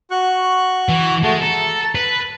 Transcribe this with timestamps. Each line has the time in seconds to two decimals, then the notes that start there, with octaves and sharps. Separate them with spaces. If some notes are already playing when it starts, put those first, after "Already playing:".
0.11 F#4 C#6 F#6
0.89 E3
1.23 G#3 A3 F#4 A5
1.42 A4 A#5
1.95 B4